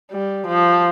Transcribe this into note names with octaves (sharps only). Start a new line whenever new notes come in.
G3
F3